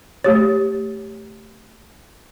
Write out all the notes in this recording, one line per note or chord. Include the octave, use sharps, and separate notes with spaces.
A3 G4 C#5